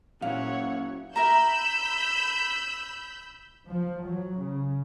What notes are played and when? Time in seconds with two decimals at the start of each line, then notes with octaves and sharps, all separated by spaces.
0.22 A#2 F#3 C#4 E4 C#5 F5 F#5
1.16 E4 A#4 A#5 B5 E6 G6 E7
3.68 F3
4.05 F#3
4.38 C#3